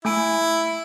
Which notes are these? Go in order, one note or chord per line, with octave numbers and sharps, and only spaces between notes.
A3 E4 G#5 D7